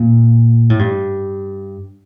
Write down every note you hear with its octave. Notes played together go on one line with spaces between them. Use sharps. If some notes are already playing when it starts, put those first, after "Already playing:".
Already playing: A#2
A2
G2